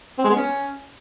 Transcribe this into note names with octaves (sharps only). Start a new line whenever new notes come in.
C4
G#3
B3
C#4